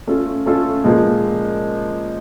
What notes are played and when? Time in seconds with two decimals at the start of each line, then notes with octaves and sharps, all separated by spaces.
0.07 A3 C#4 F4 A4
0.46 A3 C#4 F4 A4
0.84 A#2 F3 G#3